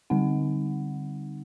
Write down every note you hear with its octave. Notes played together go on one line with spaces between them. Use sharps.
D3 G3 C4 D#4 F#5